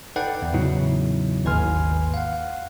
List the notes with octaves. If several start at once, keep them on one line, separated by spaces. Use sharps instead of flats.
D#4 A4 B4 D5 F#5 G5
E2
E2 A2 C#3 F#3 D#4 E4
G#1 D#2 B4 G#5 C6 F6
F5 F#5